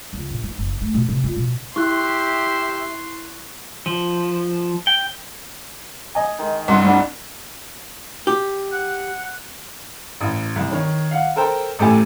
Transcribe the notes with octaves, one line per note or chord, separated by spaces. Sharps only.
C#2
A#1
D#4
F#1
A3
B2
C3
F4
B2
E4 G4 E5 C6 C#6 F#6
F3
G5
D#5 G#5
D#3 G#3 D#4
C2 G2 F#5 C6
G3 D4 F#5
G4
F#5
A1
C2
D#3 C#5
F5 F#5
A4 A#4 C5 G5
A1 A2 A3 G4 G#5 D#7